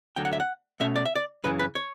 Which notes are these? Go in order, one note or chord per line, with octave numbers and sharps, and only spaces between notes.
D2 D3 F#3 G5
F#5
E5
F#5
B2 A3 C#4 E5
D5
E5
D5
F#2 C#3 E3 B4
B4
C#5